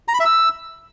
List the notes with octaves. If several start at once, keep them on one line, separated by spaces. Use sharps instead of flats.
A#5
B5
E5
E6